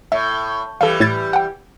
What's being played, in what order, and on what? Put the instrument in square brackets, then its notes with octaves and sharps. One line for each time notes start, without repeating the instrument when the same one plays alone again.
[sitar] A2 [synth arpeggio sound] E5
[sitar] E3 G3 [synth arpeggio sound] A4 F5
[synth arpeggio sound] A2 G#6 A6
F#5 G5